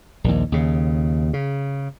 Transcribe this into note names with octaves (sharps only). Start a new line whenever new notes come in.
A#1 D#2
D#2 C#3
C#3